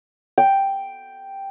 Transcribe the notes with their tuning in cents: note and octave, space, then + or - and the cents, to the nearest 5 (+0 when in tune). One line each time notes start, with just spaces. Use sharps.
G5 +0